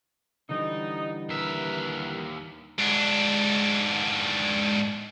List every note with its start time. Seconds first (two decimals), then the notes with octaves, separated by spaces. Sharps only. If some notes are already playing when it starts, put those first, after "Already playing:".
0.49 D3 E3 G3 D#4
1.29 D#2 A#4 B4 E5
2.78 G#2 D4